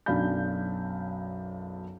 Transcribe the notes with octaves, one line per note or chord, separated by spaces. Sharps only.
B1 F#2 D4 F5 B5 G6